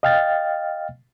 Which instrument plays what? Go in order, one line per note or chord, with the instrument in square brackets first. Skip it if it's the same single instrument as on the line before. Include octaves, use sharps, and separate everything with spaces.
[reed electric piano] D#5 F5 G5 F6 A6